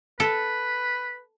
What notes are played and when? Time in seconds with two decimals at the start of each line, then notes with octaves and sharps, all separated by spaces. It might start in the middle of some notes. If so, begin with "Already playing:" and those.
0.20 A4 B4